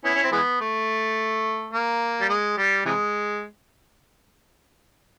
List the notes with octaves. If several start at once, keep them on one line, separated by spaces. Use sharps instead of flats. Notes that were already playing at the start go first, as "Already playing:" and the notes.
B3 C#4 E4
C#4
C4
E3 G#3 B3
A3
A#3
G3
G#3
G3
C3 E3 G#3